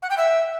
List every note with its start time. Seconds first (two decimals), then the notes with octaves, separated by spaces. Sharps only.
0.02 F#5
0.10 G5
0.18 E5